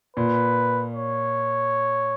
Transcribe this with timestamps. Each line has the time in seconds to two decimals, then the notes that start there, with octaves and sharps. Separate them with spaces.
0.17 A#2 B4
0.94 C#5